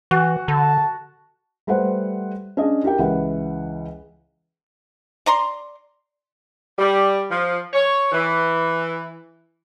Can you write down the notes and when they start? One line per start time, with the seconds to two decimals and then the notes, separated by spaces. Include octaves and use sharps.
0.11 E3 F#4
0.48 D3 A5
1.67 G3 A3 B4 C5 F#5
2.57 C#4 D4 G#4 D#5
2.83 E4 G4 A#4 G5
2.98 C#2 E3 B4 F#5
5.26 D5 A#5 C6
6.78 G3
7.30 F3
7.74 C#5
8.12 E3